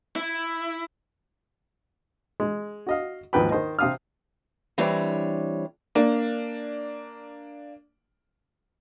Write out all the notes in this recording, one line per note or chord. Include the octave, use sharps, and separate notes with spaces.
E4
G#3
F#4 D#5 F5
D#2 G#2 F3 B4 G5 B5
D#3 C5 D#5
C3 C4 F5 D#6 F6
E3 G3 C4 D4 C#5
A#3 D4